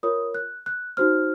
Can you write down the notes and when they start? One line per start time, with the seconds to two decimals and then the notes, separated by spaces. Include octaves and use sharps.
0.03 F4 A#4 C#5 D#6
0.35 F#6
0.66 F#6
0.97 D#4 F#4 C5 F6